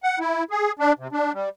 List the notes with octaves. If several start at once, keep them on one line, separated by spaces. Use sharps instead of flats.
F#5
E4
G#4
D4
C3
D4
G3